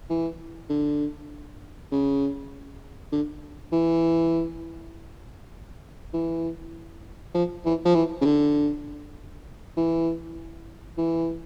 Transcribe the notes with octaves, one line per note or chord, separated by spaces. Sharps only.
E3
D3
C#3
D3
E3
E3
F3
E3
F3
E3
C#3
D3
E3
E3